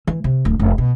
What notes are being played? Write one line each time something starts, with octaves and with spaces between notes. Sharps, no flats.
E3
C3
D1
F1
B2